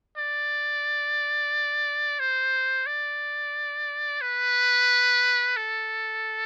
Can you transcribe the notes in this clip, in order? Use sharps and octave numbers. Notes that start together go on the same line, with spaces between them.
D5
C5
D5
B4
A4